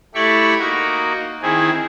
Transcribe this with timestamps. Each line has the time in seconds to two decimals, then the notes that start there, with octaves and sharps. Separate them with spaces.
0.14 A3 E4 G4 D5 B5 C#6
0.59 A#3 D#4 F#4
1.42 D#3 C4 E4 G#4